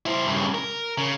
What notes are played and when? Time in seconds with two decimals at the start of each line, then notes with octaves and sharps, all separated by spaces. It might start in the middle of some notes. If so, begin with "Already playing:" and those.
0.06 E4 C5
0.26 G2 C#3
0.54 A#4
0.98 C#3